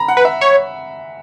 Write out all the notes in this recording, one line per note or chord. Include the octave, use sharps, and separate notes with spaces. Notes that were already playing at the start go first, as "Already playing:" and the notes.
Already playing: A#5 B5
F#5
B4
E5
C#5